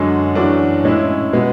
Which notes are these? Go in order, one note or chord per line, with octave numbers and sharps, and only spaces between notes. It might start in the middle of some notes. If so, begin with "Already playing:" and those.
Already playing: F#2 D3 G#3 C#4 F#4
F#2 E3 A3 D4 F#4
A2 G#3 C#4 E4
B2 G#3 B3